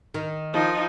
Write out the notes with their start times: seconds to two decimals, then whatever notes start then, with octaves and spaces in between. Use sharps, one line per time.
0.14 D#3
0.53 F3 D#4